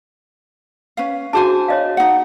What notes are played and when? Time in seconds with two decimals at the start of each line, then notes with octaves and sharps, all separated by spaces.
0.97 C#4 B4 F5
1.33 D4 F#4 G#4 C5 G#5 A5
1.68 C#5 D#5 F5
1.97 D#4 F#5